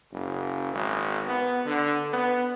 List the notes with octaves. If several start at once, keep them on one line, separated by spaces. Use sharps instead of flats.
F#1
G#1
B3
D3
B3